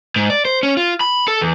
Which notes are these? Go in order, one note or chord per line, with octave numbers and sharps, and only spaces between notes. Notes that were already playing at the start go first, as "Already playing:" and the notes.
G#2
D5
C5
C#4
F4
B5
A4
E2